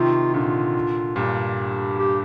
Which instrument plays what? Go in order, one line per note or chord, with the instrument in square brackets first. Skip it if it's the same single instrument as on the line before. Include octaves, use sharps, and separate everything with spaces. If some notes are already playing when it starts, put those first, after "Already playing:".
Already playing: [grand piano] C3 D#3 [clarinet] F4
[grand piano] A#2 D3 [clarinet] F4
[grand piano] G2 A#2 [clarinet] G4
[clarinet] G4